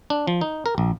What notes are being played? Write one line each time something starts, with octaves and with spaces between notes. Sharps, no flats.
D4
F3
D#4
A#4
A#1